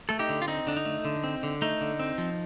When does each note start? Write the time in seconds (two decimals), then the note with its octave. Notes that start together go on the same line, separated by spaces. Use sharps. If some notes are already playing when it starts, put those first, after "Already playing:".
0.09 A3 A4
0.19 D#4 G4
0.29 D3
0.42 F4
0.48 C4 D#4
0.67 D3 D4
0.77 D#4
0.85 A3
1.05 D3
1.24 C4
1.43 D3
1.62 A3 D#4
1.81 D3
2.00 C4
2.18 F3